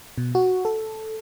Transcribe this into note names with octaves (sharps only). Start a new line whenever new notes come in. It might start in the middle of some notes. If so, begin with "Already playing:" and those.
B2
F#4
A4